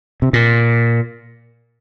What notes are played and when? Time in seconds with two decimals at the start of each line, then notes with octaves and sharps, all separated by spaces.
0.22 C3
0.33 A#2